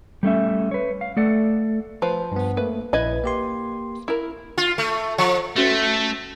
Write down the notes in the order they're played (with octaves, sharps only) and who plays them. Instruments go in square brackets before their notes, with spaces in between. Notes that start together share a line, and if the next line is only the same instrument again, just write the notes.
[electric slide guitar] G3 A3 C#4 E5
B4 C#5
F5
A3 A4 D5 F#5
[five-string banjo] F3 B4 C5
[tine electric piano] G2 B3
[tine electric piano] A3 A#3 [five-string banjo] B4
[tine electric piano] A#1 E4 G#6 [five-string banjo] B4 D#5 B5
[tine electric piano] A#3 G4 C6
[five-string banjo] E4 A#4
[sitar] F4
A3
F3
[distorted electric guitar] A3 [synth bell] C#4 F#4 A#6